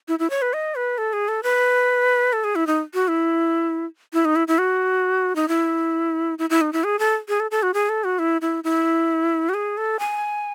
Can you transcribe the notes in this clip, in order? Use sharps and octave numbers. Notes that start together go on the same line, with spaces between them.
E4
E4
C#5
B4
D#5
B4
A4
G#4
A4
B4
A4
G#4
E4
D#4
F#4
E4
E4
D#4
E4
E4
F#4
D#4
E4
E4
E4
D#4
E4
G#4
A4
G#4
A4
A4
F#4
G#4
A4
F#4
E4
E4
E4
F#4
G#4
A4
G#5